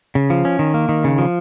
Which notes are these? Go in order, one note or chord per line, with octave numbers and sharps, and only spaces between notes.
C#3
F3
C#4
D#3
A#3
D#3
C#3
F3